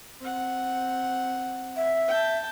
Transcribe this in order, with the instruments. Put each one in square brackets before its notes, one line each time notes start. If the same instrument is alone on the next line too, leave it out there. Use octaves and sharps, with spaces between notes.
[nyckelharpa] C4 F#5
[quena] E5
[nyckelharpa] G5 A5